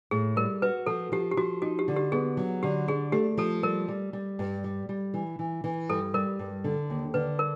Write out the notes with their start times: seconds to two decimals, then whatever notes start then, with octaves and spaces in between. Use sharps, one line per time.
0.11 A2 G#4
0.36 G3 A#4
0.62 F#4 B4
0.87 F3 A4
1.12 F3 G4
1.31 G4
1.37 F3 F#4
1.62 D#4 F#4
1.79 G4
1.88 D3
1.96 G4
2.12 B3 G#4
2.37 F#3
2.63 D3 G4
2.88 D4 G#4
3.12 A3 G4
3.37 F3 A4
3.63 G3 A#4
3.88 G3
4.13 G3
4.39 G2
4.64 G3
4.89 G3
5.14 E3
5.39 E3
5.64 E3
5.89 G2 A4
6.14 G3 A#4
6.39 G2
6.64 D3
6.90 D#2
7.14 D3 B4
7.39 A#4